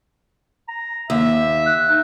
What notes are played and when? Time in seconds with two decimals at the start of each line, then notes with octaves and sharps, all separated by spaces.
0.69 A#5
1.10 D#2 E5
1.66 F#6
1.89 D#4